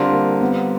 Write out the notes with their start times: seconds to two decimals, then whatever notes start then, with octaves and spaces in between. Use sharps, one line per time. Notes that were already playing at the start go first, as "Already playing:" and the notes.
Already playing: D3 G3 C4 D4 F4 A#4
0.12 A#3
0.41 B3